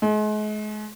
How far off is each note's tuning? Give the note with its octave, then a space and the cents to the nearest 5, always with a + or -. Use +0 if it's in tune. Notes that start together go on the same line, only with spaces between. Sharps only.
G#3 +40